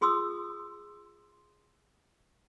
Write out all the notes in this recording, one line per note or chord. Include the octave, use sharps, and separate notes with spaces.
F4 G#4 C6 D#6 E6